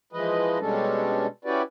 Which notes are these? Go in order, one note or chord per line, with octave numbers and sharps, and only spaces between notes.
E3 F3 G#3 B4 D#5
B2 G3 G#3 C#4 D4 A4
C#4 E4 F#4 G4 B4 D5